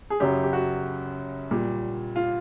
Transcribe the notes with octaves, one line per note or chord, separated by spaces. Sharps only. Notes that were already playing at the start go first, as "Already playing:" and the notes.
G#4
F#2 C#3 F#3 G4
G4
F#4
A#2 G3
F4